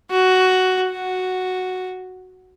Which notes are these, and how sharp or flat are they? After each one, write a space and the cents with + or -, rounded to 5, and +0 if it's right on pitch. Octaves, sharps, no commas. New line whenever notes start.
F#4 +5
F#4 +0